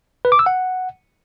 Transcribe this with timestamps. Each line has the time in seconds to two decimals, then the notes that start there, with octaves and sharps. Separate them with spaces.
0.25 B4
0.32 D6
0.39 E6
0.46 F#5